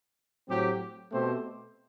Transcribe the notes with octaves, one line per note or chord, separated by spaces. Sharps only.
A2 F#3 C4 G4
B2 A3 C4 G4 C5